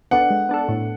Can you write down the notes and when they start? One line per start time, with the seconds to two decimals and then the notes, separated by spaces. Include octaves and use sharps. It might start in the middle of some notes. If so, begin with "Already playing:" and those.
0.11 B3 D4 A4 F#5
0.30 G#3
0.49 B3 D4 A4
0.69 A2